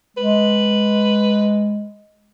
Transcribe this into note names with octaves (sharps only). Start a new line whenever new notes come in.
G#3 B4